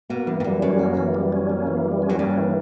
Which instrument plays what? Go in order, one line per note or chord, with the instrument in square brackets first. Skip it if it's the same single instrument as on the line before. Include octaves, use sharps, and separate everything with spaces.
[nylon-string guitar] B2 [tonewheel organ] A#3
[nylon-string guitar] G2 [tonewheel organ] E3
[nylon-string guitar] G2
[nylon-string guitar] F#2 [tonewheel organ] G3
[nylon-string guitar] F#2 [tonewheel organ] C#4
[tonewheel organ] A#3
E3
G3
C#4
A#3
E3
G3
C#4
[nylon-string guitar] F#2
[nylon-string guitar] G2 [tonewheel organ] A#3
[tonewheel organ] E3